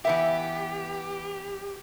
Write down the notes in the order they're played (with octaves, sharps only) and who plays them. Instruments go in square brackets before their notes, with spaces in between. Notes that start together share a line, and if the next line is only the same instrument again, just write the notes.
[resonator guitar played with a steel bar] E3 B3 E5 [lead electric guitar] G4